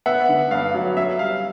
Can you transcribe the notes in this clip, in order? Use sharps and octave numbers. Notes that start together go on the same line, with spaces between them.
B3 E5 F#5
D3
G2 F5
F#3
C#4 E5
G3 F5